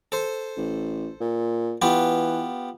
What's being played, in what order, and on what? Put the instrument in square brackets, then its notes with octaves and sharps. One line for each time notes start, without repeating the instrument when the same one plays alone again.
[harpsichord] A4 C5
[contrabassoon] A1
A#2
[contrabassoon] E3 [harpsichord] B3 F4 G4